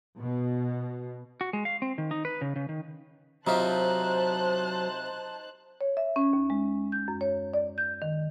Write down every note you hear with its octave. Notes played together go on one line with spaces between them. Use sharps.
B2
F#4
G#3
F5
C4
D#3
D#4
B4
C#3
C#3
D#3
C3 F#3 D#4 F4 G4 C5 A5 F#6
C#5
E5
C#4
D#2
G#3
G6
F#2
C#5
D5
G6
D#3